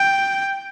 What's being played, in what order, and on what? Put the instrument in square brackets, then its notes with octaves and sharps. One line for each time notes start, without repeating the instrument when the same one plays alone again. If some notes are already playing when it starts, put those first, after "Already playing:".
Already playing: [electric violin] G5